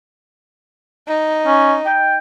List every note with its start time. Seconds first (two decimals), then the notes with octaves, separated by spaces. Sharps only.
1.08 D#4
1.46 C#4
1.86 G5